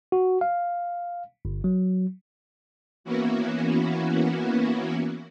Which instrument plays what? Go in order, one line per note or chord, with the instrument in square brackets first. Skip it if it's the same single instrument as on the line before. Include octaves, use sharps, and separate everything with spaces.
[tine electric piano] F#4
F5
G1
F#3
[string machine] E3 A#3 B3 C#4 E4 F#4